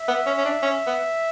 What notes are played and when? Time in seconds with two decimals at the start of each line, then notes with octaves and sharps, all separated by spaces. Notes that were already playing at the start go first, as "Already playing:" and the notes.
Already playing: E5
0.08 B3
0.26 C#4
0.38 C#4
0.45 D4
0.63 C#4
0.86 B3